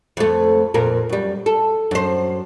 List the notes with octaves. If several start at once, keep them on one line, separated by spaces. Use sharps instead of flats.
F2 A3
F2 A#2 A#4
F#2 G3
A4
F#2 C5